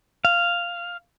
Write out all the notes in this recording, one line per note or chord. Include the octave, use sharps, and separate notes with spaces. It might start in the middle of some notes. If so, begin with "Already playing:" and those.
F5